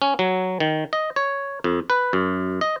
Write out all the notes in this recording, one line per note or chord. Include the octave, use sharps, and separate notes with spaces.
C#4
F#3
D#3
D#5
C#5
F2
B4
F#2
D#5